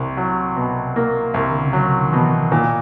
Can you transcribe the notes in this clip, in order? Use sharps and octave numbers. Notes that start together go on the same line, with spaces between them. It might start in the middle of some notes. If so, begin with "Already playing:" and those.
Already playing: C2 C3
F#3
B2
A#3
C2
D3
C#3
C3 F#3
D#3
B2 E3
A#2 D#3